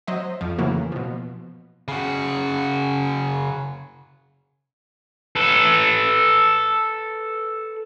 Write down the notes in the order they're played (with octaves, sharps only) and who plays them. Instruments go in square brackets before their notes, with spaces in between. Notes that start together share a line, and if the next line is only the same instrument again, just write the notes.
[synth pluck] F#3 C5 D#5 E5
F2 F3
A2 C#3 E3 F#3 A#3
B2 F3
[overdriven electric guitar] C#3 F#4
[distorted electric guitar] A4 B4